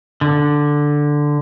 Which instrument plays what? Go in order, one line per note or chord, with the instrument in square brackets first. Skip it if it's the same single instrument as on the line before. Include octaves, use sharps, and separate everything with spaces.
[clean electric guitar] D3